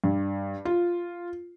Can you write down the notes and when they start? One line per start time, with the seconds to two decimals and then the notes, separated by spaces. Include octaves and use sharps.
0.04 G2
0.65 F4